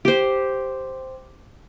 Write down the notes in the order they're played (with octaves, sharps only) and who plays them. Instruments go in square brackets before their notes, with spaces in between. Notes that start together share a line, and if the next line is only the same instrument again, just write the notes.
[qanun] G4 C5